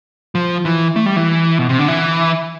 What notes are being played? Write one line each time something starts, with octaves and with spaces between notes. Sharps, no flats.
F3
E3
A3
G3
E3
B2
C3
D3
E3